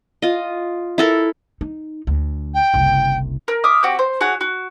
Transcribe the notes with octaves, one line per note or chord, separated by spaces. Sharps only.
F4 D#5
E4 A4 A#4
D#4
D2
G5
F#1 C2
A#4
E5 D6 D#6 F6
C4 F#4 G4
C5
F#4 G#4 C#5 F#5
F#4